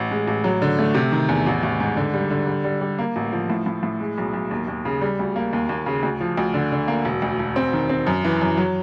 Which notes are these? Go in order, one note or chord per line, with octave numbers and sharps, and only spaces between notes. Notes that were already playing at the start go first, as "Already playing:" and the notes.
Already playing: A1
G#3
A1
F#3
D3
A3
C3
D#3
E2
A1
A1
G#2
D3
G3
D3
G3
G3
G3
A#3
A1
F3
A2
A2
A2
G#3
B1
B1
D#2
D#2
C#3
G3
D2
A#3
D#2
D#2
C#3
D2
F3
D2
D3
D3
A#3
E1
D2
E1
C4
D#3
C4
F#2
E3
F#2
F#3